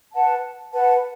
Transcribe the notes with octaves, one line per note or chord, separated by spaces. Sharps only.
B4 F#5 A5
B4 F#5 A5